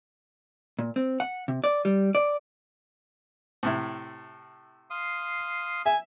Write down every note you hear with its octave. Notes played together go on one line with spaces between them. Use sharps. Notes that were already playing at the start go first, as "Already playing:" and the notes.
A#2
C4
F#5
C3
D5
G3
D5
A2 C3 E4
F5 C6 D#6
E5 G#5